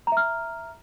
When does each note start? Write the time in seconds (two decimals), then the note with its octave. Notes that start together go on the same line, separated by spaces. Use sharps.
0.07 A#5
0.12 E5
0.17 F6